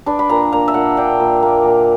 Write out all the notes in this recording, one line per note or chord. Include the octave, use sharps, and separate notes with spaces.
D4 B4
B5
A#2 A#5
A#3 A#5
E5
A#2 F#5
D4 G5
A#2
A#3
A#2